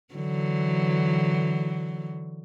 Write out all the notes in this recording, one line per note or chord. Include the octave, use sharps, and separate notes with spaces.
D3 E3 F#3